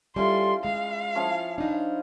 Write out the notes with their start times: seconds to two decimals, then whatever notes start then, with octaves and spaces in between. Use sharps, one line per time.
0.16 G3 C#4 E4 F4 A4 C6
0.65 G#3 F5
1.15 F3 C#4 E4
1.58 D4 D#4